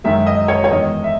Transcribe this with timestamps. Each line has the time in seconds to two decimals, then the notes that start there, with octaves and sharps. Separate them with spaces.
0.04 F#2 D#3 G#3 E5
0.27 D#5
0.48 C#5
0.64 C#5
0.71 E2 D#3 G#3 D#5
1.04 E5